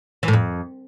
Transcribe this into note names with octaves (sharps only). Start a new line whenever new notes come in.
E3
A2
F2